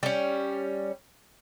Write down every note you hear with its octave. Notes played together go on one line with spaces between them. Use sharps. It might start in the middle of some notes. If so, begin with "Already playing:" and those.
G3 C#4